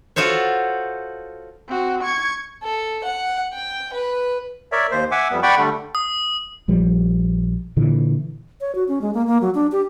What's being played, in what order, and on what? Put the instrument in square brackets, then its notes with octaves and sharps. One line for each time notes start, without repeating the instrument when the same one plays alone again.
[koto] F4 F#4 A4 C5 C#5
[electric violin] C4 F#4
C#6 G#6
[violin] A4
F#5
G5
B4
[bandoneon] A#4 C#5 D5 E5
D#2 C5
E5 F#5 G#5 D6 E6
F2 G3 B3
D5 F#5 G5 B5 C#6
D3 G3 A3
[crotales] D#6
[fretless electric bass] A#1 F3 G3
A#2 D3 E3
[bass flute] C#5
F#4
C#4
G#3
A#3
A#3
F#3
D4
G4